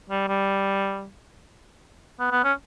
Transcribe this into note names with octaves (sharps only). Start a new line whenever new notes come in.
G3
G3
B3
B3
C#4